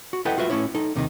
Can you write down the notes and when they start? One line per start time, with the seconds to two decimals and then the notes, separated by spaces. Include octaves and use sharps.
0.13 F#4
0.25 E4 A4 B4 D#5 F#5 G5
0.38 F4 F#4 B4 E5
0.50 A2 F#3 C#4 E4 C#5
0.75 D#4 A4
0.96 D#2 C3 D#3 D#4